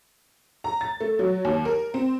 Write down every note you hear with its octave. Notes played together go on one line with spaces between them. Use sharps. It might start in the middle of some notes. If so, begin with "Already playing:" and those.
A#5
A6
A3
F#3
D#2
A#4
C4